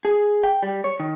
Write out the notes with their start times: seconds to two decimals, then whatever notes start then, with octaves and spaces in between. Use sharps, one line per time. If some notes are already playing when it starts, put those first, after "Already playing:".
0.05 G#4
0.43 G5
0.63 G3
0.84 C#5
1.00 D#3